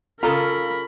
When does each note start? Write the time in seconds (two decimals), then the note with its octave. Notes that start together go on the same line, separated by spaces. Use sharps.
0.23 C#3 F4 A4 A#4 A#5 B5